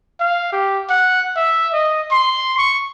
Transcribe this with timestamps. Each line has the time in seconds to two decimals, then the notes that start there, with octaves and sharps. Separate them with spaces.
0.20 F5
0.52 G4
0.90 F#5
1.36 E5
1.73 D#5
2.11 C6
2.58 C#6